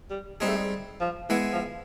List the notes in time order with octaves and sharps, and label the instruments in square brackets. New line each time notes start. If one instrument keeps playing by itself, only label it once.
[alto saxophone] G3
[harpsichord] G3 C4 D#4 G#4 [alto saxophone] G#3
[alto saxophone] A3
G#3
F3
[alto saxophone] E3 [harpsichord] G#3 B3 E4 G#4
[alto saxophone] F3